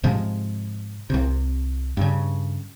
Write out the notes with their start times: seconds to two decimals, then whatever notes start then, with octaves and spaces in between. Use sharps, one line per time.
0.03 G#2 C3 F3 G#3
1.10 C2 C3
1.97 G2 C#3